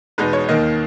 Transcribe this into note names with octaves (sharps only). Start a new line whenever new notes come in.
E2 B2 G#3 D#4 B4
C#5
D#2 D#3 A#3 D#5